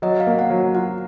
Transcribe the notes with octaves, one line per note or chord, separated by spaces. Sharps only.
F#3 D#5
F5
A#3
F#5
F#3
F4 F#5